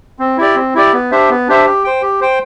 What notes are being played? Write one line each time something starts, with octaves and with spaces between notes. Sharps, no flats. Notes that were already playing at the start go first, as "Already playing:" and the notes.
C4
E4 G4 D5
C4
E4 G4 D5
B3
D4 G4 C5 E5
B3
D4 G4 C5 E5
G4
C5 G5
G4
C5 G5